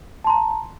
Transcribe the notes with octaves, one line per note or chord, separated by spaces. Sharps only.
A5 A#5 C6